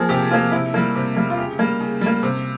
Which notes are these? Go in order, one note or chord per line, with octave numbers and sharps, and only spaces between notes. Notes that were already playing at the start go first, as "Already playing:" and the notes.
Already playing: F3 A#3 G#4
C3 G4
F3 A#3 F4
C3 E4
G3 A#3
C3
G3 A#3
F4
C#3 G4
G3 A#3
C#3
G3 A#3
C3